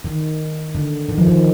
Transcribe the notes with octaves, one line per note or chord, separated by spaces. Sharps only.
D#3
D3
D#3
F3
D#3